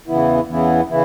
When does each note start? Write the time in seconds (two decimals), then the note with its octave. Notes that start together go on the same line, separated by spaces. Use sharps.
0.07 E2 C#3 E3 B3 E4
0.48 E2 C#3 E3 B3 E4
0.89 C#3 E3 E4